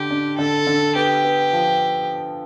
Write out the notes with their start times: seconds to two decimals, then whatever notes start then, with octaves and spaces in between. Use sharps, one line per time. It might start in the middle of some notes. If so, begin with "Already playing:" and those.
Already playing: D3 G4
0.10 D4
0.38 D3 A4
0.67 D3
0.95 B3 G4
1.25 B3
1.53 F3